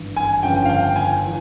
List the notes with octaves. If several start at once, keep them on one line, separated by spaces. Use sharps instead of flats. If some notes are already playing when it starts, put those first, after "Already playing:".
Already playing: G#1 G2 E3
G#5
G1 F2 C#3 G5
F5
G5
G#5
E3